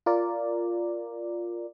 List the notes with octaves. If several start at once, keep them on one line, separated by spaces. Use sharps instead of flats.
F4 A#4 D5